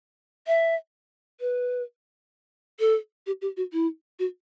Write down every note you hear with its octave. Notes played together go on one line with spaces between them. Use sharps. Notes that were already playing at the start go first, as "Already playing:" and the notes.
E5
B4
A4
G4
G4
F#4
E4
F#4